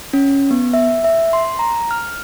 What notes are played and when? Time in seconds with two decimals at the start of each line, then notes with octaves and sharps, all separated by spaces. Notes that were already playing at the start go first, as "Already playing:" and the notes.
0.13 C#4
0.51 B3
0.73 E5
1.04 E5
1.33 C6
1.59 A#5
1.91 F6